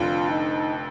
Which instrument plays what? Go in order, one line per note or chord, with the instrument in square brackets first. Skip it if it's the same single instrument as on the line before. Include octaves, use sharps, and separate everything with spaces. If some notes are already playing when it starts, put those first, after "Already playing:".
Already playing: [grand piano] F1 F2 D3 [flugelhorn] F4
[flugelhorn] D#4